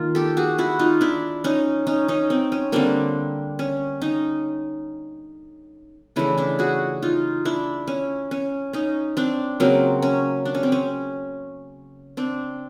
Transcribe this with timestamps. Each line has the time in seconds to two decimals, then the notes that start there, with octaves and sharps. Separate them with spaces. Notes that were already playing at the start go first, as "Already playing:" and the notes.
Already playing: D#3 A#3 F4
0.15 G4 A4
0.37 F#4 G#4
0.58 E4 F#4
0.79 D#4 F4
1.01 D4 E4
1.44 C#4 D#4
1.87 C#4 D#4
2.08 C#4 D#4
2.30 C4
2.52 C#4
2.72 D3 G3 A#3 C4 D4
3.59 C#4
4.01 C#4 D#4
6.16 C#3 E3 A3 D4 E4
6.38 D4 E4
6.59 F#4 G#4
7.02 D#4 F4
7.45 D4 E4
7.88 C#4
8.31 C#4
8.73 C#4 D#4
9.17 C4 D4
9.60 C#3 F#3 A#3 C4
10.02 C#4
10.45 D4
10.55 C#4
10.63 C4
10.72 C#4
12.17 C4 D4